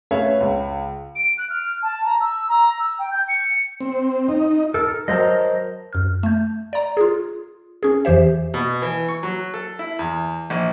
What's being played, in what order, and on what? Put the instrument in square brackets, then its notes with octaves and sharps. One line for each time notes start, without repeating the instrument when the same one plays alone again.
[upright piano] A3 C#4 B4 C#5 E5 F5
C#2
[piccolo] D7
F#6
F6
A5
A#5
E6
A#5
E6
G5
G6
C#7
[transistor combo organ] C4
D#4
[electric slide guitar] A4 A#4
[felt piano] F#3 A5 [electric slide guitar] A#4 C5 D#5
[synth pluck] F#2 F6
A3 G6
D5 A#5
F4 G#4
C#4 G#4
F2 E3 G4 C5 E5
[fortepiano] B2
E3
C#6
F#3
A4
E4
E2
A#1